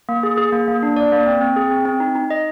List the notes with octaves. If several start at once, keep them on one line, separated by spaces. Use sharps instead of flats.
A#3
G#4
G#4
A#3
A#3
D4
D5
A#3
C4
C4
G#4
C4
C4
D#4
D#4
D#5